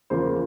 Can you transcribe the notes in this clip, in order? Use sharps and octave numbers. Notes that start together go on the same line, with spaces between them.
E2 C#3 F3 A#3 C5